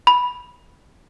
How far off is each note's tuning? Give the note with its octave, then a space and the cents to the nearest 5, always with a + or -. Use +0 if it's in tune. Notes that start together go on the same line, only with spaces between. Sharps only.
B5 -5